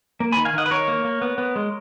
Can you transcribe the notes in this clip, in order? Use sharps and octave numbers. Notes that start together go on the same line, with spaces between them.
A#3
D#3 G#5 B5
F5 G#5
D#3 D#5 F#5
B4
D#3 A#4 C#5
A#3
A#3
B3
B3
G#3